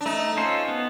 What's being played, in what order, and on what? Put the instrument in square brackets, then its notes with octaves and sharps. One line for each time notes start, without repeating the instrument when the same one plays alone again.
[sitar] D4
[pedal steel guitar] A3 [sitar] D#4
[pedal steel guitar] C#4 F4 A4 C5
B3